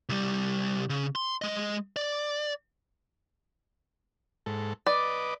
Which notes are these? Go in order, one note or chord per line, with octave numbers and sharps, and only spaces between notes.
C2 G3
C#3
C6
G#3 D#5
D5
G#2 A4
B4 D5 D#5 D6